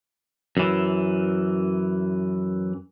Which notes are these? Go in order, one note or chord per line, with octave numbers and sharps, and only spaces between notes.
F#2 E3